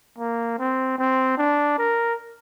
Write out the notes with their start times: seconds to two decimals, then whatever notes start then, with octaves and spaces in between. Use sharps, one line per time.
0.19 A#3
0.59 C4
0.98 C4
1.38 D4
1.78 A#4